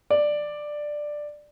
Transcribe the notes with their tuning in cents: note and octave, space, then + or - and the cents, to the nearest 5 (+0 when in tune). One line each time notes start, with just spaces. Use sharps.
D5 +10